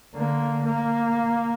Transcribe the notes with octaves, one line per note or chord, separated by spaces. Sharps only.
D3 A#3
A#3